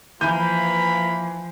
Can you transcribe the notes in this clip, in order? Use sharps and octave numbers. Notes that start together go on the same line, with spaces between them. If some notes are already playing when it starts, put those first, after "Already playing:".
E3 F3 A#3 B4 B5 G6 D#7